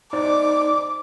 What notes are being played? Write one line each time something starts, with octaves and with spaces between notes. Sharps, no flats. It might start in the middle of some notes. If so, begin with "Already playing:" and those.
D#4 C5 D5 D6